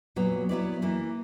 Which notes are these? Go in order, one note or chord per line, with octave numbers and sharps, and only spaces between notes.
A#2 F#3 B3 F#4
F#3 B3 E4 B4 D5
E3 A#3 E4